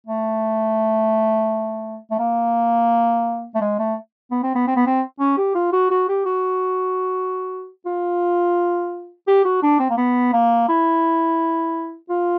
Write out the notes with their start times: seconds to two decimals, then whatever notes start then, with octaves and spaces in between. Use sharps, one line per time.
0.07 A3
2.11 A3
2.19 A#3
3.55 A3
3.61 G#3
3.79 A3
4.31 B3
4.43 C4
4.55 B3
4.67 C4
4.76 B3
4.87 C4
5.19 C#4
5.37 G4
5.55 F4
5.72 F#4
5.91 F#4
6.09 G4
6.25 F#4
7.86 F4
9.27 G4
9.45 F#4
9.63 D4
9.79 C4
9.90 A#3
9.97 B3
10.33 A#3
10.69 E4
12.10 F4